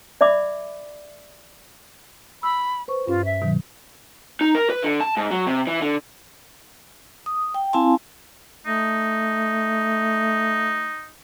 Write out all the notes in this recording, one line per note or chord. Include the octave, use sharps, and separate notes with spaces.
D5 E5 B5 D6
B5 E6
B4 C5 C#6
G2 C#4 F4
E5
B2 D#3 F#3
D#4
A#4
B4
D3
A5
G#2
F#3
C3
E3
D3
D#6
G5
C4 E4 F5 G#5 A5 C6
A3 D#4